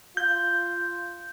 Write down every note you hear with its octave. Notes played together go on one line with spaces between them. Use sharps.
F4 G6